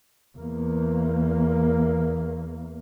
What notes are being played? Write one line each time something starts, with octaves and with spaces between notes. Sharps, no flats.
E2 A#3